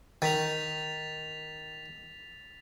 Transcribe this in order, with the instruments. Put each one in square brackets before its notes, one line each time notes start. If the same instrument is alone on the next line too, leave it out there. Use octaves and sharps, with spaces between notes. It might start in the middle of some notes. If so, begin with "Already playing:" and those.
[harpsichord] D#3 [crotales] A6 B6 F7